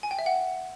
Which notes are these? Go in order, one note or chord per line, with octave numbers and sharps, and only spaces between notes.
G#5
G5
E5
F#5